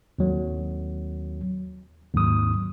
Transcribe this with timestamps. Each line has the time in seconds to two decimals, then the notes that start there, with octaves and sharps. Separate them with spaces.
0.19 D#2 F#3
2.13 D#2 G#2 F#3 D#6